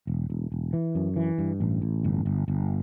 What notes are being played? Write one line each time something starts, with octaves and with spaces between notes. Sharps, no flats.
E1
E1
E1
E3
F#2
E3
G2
A1
A1
G1
G1
G1